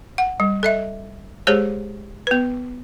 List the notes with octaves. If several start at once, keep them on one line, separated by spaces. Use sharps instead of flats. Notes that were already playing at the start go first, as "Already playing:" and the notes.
F#5
G3
A4 D#5 E5
G#3 G4 G#4 C5 C#5
B3 B4